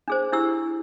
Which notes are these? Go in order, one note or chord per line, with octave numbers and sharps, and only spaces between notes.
D4 G#4 C5
D4 E4 G4 E6